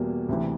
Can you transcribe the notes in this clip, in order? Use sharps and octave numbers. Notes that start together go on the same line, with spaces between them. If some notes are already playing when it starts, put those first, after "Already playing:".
Already playing: E2 B2 G3 A#3
D2 C3 E3